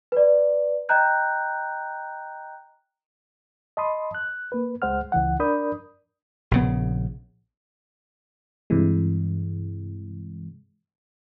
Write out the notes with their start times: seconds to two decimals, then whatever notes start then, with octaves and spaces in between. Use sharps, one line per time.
0.12 B4 D5
0.89 D#5 G5 A#5 F#6 G6
3.77 D#5 A5 B5 C6 D#6
4.15 F#6
4.52 A#3 B4
4.82 C#2 G#3 C5 F#5 F6
5.12 C#2 E3 F#5
5.40 D4 A#4 D5 B5 D#6 G6
6.51 A#1 C#3 B3
8.70 G2 C3 E3 G#3